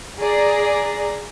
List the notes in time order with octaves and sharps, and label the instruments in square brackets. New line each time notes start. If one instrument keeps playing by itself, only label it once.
[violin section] G#4 D5 A#5